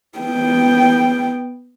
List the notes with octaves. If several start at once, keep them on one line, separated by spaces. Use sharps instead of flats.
B3 G5